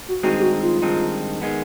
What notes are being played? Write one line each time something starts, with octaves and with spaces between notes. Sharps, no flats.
F#4
G2 D#3 G#3 C4 D#4 F#4
G4
F#4
F4
G2 D#3 G#3 C4 D#4
D#3 G#3 B3